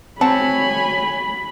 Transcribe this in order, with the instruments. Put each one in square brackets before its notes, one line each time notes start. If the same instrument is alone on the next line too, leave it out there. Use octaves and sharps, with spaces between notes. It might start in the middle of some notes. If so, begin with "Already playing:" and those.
[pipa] F#3 F#5 A5 [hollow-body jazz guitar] C4 [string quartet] C#5 G#5 [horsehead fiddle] B5